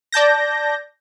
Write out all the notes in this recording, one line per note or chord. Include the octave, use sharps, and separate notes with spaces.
D5 A5 G6 A#6